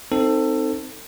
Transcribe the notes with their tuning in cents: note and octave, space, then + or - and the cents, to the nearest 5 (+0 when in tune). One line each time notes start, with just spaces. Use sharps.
C4 +0 D#4 +0 A4 +20